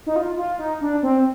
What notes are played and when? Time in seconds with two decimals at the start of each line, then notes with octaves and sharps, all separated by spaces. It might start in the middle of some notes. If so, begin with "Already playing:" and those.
0.06 D#4
0.16 F4
0.37 F4
0.58 D#4
0.81 D4
1.03 C4